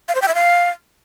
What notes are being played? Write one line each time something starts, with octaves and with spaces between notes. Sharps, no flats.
F5
C5
G5
E5
F5